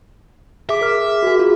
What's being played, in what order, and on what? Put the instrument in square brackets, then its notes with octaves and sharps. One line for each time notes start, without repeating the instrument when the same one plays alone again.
[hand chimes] G#4 D6 [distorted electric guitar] E5
[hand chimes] A#4 F6
F#4 G#4
F4